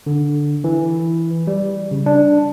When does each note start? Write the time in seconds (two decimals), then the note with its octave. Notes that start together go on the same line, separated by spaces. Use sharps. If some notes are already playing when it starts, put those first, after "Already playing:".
0.06 D3
0.64 E3
1.47 G3
1.91 C#3
2.06 D4